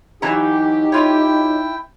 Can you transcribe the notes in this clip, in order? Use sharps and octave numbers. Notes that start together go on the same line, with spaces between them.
E3 F#3 D#4 G4 A#5
E4 F4 C#5 G5